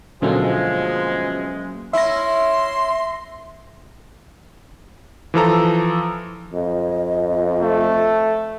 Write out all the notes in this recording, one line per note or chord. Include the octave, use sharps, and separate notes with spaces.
D2 B2 F3 F#3 G#3 A#3 C#4 A4
C#4 E4 E5 C6 A#6
E3 F3 A4 A#5
F2 D#5
A3